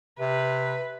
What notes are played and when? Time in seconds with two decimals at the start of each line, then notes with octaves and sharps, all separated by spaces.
0.20 C3 B4